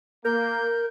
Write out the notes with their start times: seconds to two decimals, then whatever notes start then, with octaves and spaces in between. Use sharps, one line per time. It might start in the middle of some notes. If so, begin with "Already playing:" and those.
0.25 A#3 A#4 G6